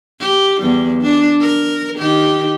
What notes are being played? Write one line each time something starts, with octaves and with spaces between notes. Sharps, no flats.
G4
E2 G3
D4
A#4
D#3 G4